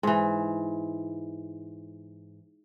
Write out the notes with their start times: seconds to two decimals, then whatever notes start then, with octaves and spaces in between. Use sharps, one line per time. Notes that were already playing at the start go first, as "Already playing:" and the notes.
0.03 G#2 E3